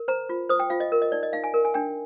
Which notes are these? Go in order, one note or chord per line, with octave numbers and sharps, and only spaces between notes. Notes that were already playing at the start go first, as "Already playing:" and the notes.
Already playing: A#4
C5 A#5
F4
C5 D#6
G5
F4 F5
D#5
A#4
D#5
D#4 D5
D#5
D#4 F5
G#5
A#4
G#5
D4 G5